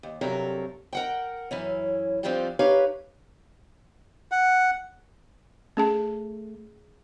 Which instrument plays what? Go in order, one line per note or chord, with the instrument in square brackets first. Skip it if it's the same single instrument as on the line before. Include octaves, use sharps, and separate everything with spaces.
[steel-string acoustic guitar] D#2
G2 C3 F#3 A4 A#4
A#4 F#5 G5
F#2 E3 C#4
F3 G3 C4 D4 F4 G4
D#4 G4 B4 C#5 F5
[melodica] F#5
[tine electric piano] A3 [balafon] C#4 G#4 A5